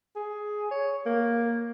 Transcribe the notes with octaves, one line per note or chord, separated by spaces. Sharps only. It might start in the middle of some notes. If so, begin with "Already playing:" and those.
G#4
C#5
A#3